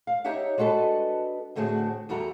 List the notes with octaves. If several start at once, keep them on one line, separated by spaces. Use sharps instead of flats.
F5
D#4 G4 C#5 E5 F#5
G#3 D4 F#4 A4 B4
A2 D3 A3 C4 F#4 G#4
E2 G3 F#4 A4 A#5